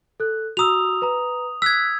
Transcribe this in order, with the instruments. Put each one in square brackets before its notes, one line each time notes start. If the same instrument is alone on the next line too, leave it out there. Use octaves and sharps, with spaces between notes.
[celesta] A4 F#6
[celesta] F#4 A#5 E6 [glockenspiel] D#6 F7
[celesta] B4 A#5
[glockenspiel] E6 G#6 [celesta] F#6 B6